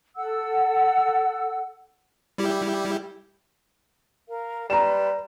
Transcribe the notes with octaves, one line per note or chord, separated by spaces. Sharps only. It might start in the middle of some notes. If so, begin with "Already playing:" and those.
A4 F#5 E6
G3 E4 G4
A#4 F5
G3 B4 A#5 C6 E7